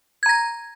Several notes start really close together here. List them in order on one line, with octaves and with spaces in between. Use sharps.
G#6 A#5 A#6